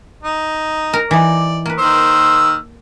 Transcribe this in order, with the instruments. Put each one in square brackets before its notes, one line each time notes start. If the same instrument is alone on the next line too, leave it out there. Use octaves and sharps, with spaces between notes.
[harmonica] D#4
[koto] A#4
[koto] E3 D#4 [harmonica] D5
[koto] A#3 B4
[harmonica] D#3 C5 E6